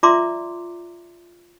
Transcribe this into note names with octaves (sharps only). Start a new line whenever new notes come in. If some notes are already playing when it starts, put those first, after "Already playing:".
F4 D5 E5 A#5 C6 D6